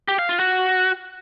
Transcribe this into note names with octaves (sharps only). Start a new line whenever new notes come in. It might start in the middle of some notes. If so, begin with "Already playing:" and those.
G4
F5
F4
F#4